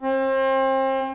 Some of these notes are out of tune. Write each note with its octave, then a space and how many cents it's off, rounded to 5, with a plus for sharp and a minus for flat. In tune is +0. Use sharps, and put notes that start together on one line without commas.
C4 +35